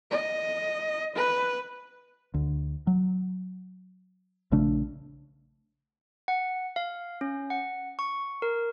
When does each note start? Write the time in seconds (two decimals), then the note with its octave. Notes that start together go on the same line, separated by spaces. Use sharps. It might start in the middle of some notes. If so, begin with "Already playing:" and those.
0.11 D#5
1.16 B4
2.34 D2
2.87 F#3
4.52 A#1 C#3 A3 D4
6.28 F#5
6.76 F5
7.21 C#4
7.50 F#5
7.99 C#6
8.42 A#4